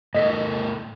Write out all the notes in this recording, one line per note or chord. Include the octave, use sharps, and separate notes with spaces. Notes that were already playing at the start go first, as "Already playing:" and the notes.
A2 A4 A#4 D#5 B6